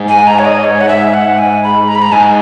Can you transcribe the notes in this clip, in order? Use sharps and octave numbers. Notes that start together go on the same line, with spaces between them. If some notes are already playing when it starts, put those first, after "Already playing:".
Already playing: G#2
G#5
A#5
C#5
D#5
C#5
F#5
E5
F#5
G#5
B5
A#5
B5
A#5
G#2 G#5